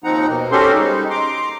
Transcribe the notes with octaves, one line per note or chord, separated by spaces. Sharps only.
D#2 F3 C4 D#4 F#5 A#5
B2 A#3
C#4 F#4 G4 A4 C5 C6
G3 G#3 D#4
A#5 C6 D6